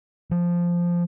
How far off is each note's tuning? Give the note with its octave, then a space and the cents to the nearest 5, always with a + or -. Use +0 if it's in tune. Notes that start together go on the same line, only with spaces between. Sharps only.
F3 -5